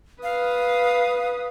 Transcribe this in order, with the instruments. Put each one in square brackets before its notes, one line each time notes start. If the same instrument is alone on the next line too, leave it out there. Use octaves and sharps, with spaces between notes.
[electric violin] B4 D#6 [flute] F5